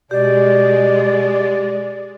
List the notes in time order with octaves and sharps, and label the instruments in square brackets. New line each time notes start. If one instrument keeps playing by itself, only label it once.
[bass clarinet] B2 [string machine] G#3 [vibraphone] G4 [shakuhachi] D5